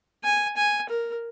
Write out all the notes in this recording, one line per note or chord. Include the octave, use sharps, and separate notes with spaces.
G#5
G#5
A#4